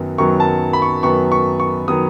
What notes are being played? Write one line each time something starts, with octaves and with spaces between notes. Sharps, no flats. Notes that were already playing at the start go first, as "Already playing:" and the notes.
Already playing: F#2 D#3 F#3 B3
F#2 D#3 F#3 B3 C#6
A5
B5
C#6
F#2 D#3 F#3 B3 C#6
C#6
C#6
D#3 F#3 B3 D#6